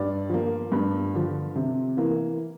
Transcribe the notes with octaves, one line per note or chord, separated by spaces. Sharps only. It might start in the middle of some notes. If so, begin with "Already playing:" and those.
Already playing: G2 D5
F3 A#3
G2
D3 F3
C3
E3 A#3